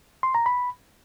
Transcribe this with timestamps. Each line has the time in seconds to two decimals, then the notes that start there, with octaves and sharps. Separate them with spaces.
0.23 C6
0.35 A#5
0.46 B5